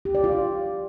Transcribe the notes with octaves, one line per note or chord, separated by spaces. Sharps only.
G4
D5
F4